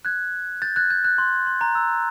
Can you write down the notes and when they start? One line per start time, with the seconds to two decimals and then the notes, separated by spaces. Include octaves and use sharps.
0.05 F#6 G#6
0.62 G6 A6
0.76 F#6 G#6
0.90 G6
1.04 F#6
1.18 C6
1.47 C6
1.61 A#5
1.75 E6